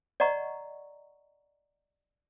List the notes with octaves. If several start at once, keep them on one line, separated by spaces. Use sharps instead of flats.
D5 D#5 F#5 A#5 C#6